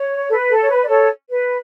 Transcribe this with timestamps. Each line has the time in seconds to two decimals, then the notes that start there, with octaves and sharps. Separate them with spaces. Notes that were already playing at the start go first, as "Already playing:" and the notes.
Already playing: C#5
0.28 A4
0.32 B4
0.50 A4
0.61 C#5
0.69 B4
0.82 D5
0.87 A4 C#5
1.30 B4